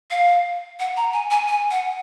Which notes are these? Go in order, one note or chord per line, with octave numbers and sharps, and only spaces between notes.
F5
F#5
A#5
G#5
G#5
G#5
F#5